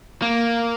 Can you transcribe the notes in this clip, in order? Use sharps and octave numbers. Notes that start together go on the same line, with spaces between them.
A#3